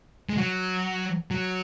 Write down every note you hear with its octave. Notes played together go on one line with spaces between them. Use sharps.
G#3
F#3
F#3